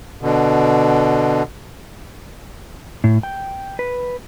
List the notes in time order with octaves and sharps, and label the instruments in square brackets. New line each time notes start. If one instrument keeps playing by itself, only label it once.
[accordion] B2 D3
[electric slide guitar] A2
G5
B4